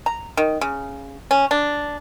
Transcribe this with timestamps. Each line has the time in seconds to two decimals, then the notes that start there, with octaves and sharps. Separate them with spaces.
0.06 A#5
0.37 D#3
0.61 C#3
1.31 C#4
1.51 D4